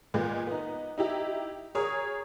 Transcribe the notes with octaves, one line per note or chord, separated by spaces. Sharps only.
A#2 G#3 B3
B3 D#4
D#4 E4 G4
G#4 A#4 C#5 D#6